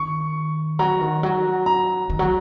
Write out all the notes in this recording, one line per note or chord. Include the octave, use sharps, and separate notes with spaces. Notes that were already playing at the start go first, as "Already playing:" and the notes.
Already playing: D#3 C#6
F#3 A#5
D#3
F#3
A#5
D#3
F#3